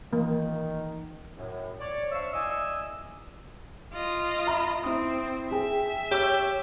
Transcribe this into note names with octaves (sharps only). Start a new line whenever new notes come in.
D#3 E3 A#3
F#2 A2
C#5 D5
D4 C5 E5 F5 C#6 E6
E4 D5 D#5 G#5 E6
F4 D#5
E5 A#5 B5
C4 E4 D#6
G#4 E5 G5
G4 C#5 E6